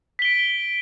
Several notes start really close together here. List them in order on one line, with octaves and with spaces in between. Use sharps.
B6 G7 D7